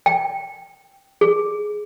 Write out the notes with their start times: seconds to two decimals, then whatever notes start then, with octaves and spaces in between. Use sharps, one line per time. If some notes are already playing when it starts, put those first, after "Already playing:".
0.06 G5
1.21 G#4